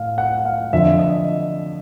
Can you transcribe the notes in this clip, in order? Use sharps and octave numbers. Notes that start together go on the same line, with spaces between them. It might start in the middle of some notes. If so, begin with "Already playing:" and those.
Already playing: A2 F5
F#5
F5
F2 D3 F3 E5
D#5